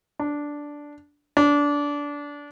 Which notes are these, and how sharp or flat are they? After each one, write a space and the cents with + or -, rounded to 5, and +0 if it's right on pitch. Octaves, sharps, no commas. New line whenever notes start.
D4 -5
D4 -20